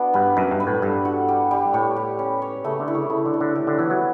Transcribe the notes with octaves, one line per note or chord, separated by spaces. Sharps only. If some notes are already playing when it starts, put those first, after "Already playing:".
Already playing: B3 D4 F#4
G2 B4
F#2 B4
G2
B4
A2
G2 A4
F#4
G3
G3
A2 C#5
G4
C#4
C#5
C#3 A3
D3
E4
C#3
C#3 A3
D3
A3
D3
G4
D3
E3 B3
F#3